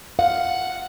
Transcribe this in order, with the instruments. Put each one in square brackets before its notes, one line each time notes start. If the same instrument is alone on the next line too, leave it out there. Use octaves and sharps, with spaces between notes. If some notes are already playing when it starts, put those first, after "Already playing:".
[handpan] F5 [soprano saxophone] F#5